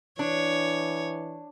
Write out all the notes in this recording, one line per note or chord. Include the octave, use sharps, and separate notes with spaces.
E3 D4 C#5